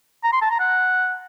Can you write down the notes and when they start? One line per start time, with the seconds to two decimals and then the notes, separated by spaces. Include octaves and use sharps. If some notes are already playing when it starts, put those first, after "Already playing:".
0.24 A#5
0.33 C6
0.42 A5
0.51 A#5
0.60 F#5